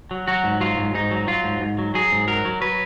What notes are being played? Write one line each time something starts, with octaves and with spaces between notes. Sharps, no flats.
F#3
F#3 F#4
G#2
F#3 F4
G#2
G#2 D#4
F#3
F#3 F4
G#2
G#2
F#3
F#3 G#4
G#2
F#3 A#4
F#3
F#3 B4